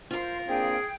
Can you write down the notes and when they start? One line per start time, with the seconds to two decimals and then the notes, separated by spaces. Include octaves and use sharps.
0.11 F4 A#4 C5
0.48 A#3 C4 D4 G#4 G5